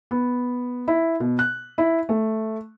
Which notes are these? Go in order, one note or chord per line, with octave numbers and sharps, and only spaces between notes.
B3
E4
B2
F#6
E4
A3